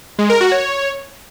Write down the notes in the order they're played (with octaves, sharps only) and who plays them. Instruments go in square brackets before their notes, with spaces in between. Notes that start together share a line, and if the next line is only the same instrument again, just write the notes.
[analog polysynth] G#3
A#4
F#4
C#5